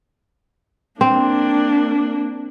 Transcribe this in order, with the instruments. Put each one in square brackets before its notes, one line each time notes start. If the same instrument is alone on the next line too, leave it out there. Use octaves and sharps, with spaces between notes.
[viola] A#3 D4 [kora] C4